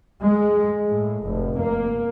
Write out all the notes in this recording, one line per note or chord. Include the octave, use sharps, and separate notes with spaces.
G#3
A2
F1
A#3